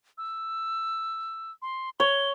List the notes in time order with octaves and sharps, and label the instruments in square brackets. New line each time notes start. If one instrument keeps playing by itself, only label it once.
[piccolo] E6
C6
[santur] C#5 [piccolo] G7